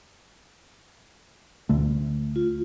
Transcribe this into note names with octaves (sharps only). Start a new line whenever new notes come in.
D2 D3 A3
F4